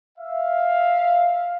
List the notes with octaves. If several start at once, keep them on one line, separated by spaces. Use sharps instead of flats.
E5 F5